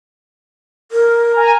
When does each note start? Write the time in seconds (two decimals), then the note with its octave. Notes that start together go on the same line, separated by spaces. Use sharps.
0.92 A#4
1.32 G#5 A#5